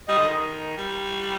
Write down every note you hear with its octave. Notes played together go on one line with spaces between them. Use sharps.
G3 D#5
D3
D#3
G3